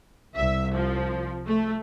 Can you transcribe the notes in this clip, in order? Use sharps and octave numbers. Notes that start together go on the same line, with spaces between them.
C2 E5
F3
A3